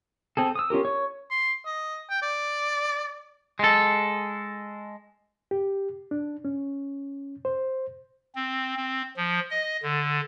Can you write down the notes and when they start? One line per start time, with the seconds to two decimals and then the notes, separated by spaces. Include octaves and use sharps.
0.37 C4 G#4 A4
0.55 D#6 E6
0.70 C#4 F4 G4 A#4
0.85 C#5
1.30 C6
1.66 D#5
2.10 G5
2.22 D5
3.59 G#3 A4
5.51 G4
6.11 D4
6.45 C#4
7.45 C5
8.35 C4
8.77 C4
9.16 F3
9.50 D#5
9.83 D3